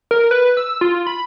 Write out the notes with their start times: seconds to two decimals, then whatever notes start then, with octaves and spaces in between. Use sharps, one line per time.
0.11 A#4
0.31 B4
0.57 E6
0.81 F4
1.07 B5